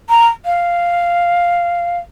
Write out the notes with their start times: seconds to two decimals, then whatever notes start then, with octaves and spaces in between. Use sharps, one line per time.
0.09 A#5
0.45 F5